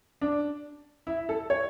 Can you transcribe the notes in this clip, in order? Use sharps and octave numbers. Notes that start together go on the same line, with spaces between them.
D4
E4
A4
C#5